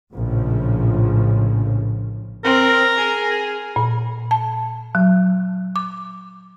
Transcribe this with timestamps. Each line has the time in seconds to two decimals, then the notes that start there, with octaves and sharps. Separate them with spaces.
0.14 A#1 A2 C#3 F3
2.44 C4 A#4
2.96 G#4
3.76 A#2
4.31 A5
4.95 F#3
5.76 D6